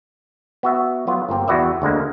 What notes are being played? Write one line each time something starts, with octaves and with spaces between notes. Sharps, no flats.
B3 F#4 E5
F#3 B3 F4
G1 A#3 C4 G4
E2 F#4 B4 D5 E5
D2 D3 G#3 A#3